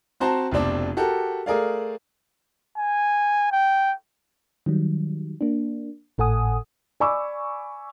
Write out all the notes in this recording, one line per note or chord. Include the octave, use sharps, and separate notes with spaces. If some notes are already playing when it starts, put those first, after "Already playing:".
C4 F#4 C5 A5 A#5
F1 F2 B2 C4 D4 D6
F#4 G4 A4 A#4
A3 G#4 A#4 D5 F5
G#5
G5
D#3 F#3 G3
A#3 D4
G#1 A2 A4 F#5 G#5 D#6
D5 G#5 B5 C#6 D6 E6